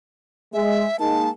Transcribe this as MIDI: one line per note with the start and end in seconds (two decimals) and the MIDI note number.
0.53 0.83 56
0.53 0.99 76
0.99 1.28 56
0.99 1.28 58
0.99 1.28 63
0.99 1.28 81